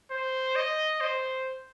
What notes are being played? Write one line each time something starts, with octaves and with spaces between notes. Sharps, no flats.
C5
D#5
C5